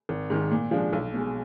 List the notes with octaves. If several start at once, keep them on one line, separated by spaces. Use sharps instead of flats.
G#1
G#2 D#3
A#2
F3 G#3 D4
B1
B2 G#3